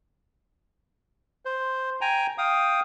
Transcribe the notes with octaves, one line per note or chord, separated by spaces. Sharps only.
C5
G5 G#5 A#5
F5 G5 D#6